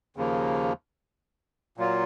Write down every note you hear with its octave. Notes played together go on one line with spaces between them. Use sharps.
D#2 C#3 F3 A#3
A#2 F#3 A#3 F4